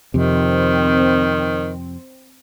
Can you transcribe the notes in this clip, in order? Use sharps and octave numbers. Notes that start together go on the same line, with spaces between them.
F2 C3 D#3 C4